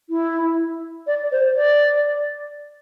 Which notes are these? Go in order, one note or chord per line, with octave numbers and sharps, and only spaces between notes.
E4
D5
C5
D5